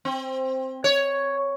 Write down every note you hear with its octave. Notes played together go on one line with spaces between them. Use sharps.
C4
C#5